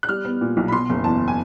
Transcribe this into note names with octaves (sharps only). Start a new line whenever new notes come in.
F#6
G3 F6
B3
A#2
B1
B5
B2 C6
F#1
E2 A5
G#5